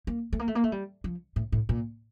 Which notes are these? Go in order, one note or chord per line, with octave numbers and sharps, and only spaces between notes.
A#3
A3
A#3
A3
A#3
A3
G3
F3
A2
A2
A#2